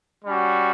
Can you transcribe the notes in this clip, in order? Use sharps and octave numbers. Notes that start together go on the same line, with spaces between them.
G3 C#4 F#4